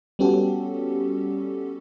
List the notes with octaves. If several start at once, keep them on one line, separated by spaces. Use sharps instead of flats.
G3 B3 C#4 F#4 G4 A4